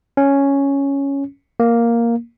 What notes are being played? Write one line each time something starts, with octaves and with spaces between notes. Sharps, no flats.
C#4
A#3